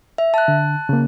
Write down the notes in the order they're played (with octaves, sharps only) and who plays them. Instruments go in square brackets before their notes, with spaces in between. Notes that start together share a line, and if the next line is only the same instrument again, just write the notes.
[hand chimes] E5
A5 F#6
[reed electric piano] D3
C#3 A#3